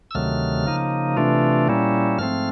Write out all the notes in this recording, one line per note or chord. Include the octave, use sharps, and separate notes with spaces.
E6
D2 C3 D#3 F#3 A3 F6
C#3 F3 A#3 D#4
C3 E3 A3 D4 F4
A#2 G3 A#3 C#4 E4
G#2 F3 A3 C4 F6